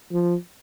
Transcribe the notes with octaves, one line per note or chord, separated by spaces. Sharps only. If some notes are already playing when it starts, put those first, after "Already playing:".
F3